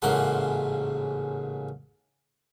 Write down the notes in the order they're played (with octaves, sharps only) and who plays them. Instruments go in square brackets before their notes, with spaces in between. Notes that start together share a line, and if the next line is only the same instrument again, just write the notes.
[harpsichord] A1 G#2 C#3 A#3 F#5 C6